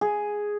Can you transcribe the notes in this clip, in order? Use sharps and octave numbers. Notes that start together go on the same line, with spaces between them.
G#4